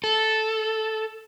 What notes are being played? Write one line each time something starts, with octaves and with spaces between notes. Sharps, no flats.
A4